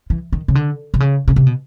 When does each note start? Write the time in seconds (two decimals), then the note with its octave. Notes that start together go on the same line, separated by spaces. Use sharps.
0.10 E3
0.32 D#3
0.48 C#3
0.55 D3
0.94 C3
1.00 C#3
1.28 C#3
1.36 C3
1.47 B2